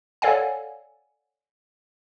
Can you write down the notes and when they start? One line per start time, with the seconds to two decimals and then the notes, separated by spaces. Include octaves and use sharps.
0.22 A4 C#5 D5 F5 F#5 G#5